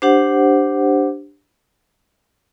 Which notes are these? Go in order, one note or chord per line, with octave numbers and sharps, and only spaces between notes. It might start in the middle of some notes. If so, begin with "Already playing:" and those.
D4 G4 C5 F#5